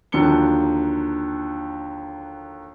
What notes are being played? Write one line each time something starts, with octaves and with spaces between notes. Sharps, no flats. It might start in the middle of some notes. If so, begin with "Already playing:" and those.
D#2 D3 F3 F#3 C#7 G7